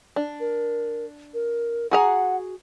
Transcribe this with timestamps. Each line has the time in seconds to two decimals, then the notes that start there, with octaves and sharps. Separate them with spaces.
0.16 D4
0.40 A#4
1.34 A#4
1.91 F#4 G#4 F#5 A#5